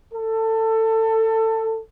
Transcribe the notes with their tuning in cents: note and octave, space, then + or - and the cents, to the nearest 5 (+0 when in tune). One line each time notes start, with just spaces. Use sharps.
A4 +20